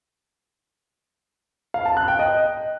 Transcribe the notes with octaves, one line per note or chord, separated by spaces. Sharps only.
F5
A5
F#6
G5
D#5